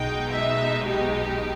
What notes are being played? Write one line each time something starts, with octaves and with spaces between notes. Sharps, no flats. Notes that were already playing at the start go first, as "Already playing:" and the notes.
Already playing: B1 B2 G#3 D#4 G5
E5
G4